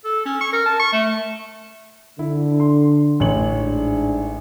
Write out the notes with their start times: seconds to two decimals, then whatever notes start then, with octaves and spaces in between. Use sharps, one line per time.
0.05 A4
0.25 C#4
0.41 C#6
0.53 A#4
0.66 A5
0.80 C#6
0.93 A3
2.19 D3 E4
2.60 C6
3.20 A1 C#5 F#7
3.54 G#2 D4